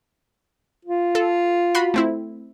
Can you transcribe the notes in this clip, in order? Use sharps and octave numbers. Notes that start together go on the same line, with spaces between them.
F4
A4
F#4 B5 C6
A3 C4 E4